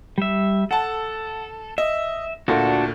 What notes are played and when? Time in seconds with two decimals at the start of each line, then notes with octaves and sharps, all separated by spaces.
0.18 G3 E5
0.71 A4 F#5 A5
1.78 D#5 E5
2.48 D2 A#2 D4 F#4 A4